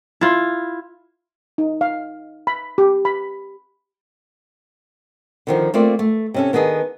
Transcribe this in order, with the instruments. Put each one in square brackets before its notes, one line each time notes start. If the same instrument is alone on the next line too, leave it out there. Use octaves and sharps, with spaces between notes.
[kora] E4 F4
[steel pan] D#4
F5
B5
G4
B5
[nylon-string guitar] D3 D#3 F3
A3 A#3 C4 F4 D5
A3
C3 C#4 A4
D#3 B3 D4 G#4 A4